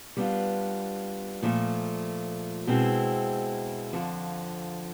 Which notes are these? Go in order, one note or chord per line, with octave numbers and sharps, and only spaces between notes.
G3 B3 D4 F4
A#2 F3 A3
B2 G#3 C4 E4
F2 D3 F3